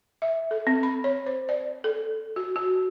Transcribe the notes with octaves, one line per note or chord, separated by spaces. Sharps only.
E5
A4
C4
B5
C#5
C5
D5
A4
F#4
F#4